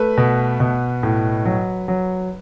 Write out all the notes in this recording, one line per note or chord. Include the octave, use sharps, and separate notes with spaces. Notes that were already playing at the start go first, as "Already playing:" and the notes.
Already playing: A3 B4
B2
B2
A2
F#3
F#3